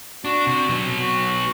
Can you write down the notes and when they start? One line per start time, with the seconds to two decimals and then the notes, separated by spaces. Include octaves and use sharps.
0.25 D4 F#4
0.47 C3
0.69 F#3 B3
0.99 F#4